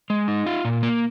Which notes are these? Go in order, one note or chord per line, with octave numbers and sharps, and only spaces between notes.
G#3
D#4
F4
A#2
A#3